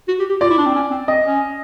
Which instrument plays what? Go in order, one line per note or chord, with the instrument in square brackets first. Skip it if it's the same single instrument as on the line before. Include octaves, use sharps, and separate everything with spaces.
[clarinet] F#4
G4
G4
[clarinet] F4 [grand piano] D5
[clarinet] E4
D4
C4
C#4
C4
[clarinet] C4 [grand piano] D#5
[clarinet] C#4